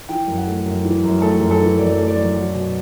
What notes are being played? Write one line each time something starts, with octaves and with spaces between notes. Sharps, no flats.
E3 G5
F#2
F#5
A3
F#2
E3
F#2
A3 A4
F#2
A4
E3
F#2 D5
A3
D5
F#2
F#3
B2